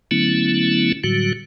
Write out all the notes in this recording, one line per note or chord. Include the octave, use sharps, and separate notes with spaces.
D3 F#3 A3 B3 C#4 E4
A2 D3 F#3 G3 F#4